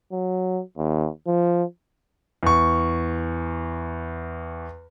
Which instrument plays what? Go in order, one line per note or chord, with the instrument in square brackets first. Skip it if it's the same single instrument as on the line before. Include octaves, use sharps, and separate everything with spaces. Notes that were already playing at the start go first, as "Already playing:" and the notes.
[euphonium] F#3
D#2
F3
[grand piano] E2 C#6